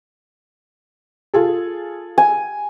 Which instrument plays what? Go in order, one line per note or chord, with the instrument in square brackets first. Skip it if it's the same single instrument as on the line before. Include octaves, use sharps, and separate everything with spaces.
[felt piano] F4 G#4 A4
[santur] G#5